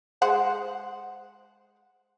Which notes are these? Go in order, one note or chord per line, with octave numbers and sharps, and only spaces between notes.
G#3 C5 F#5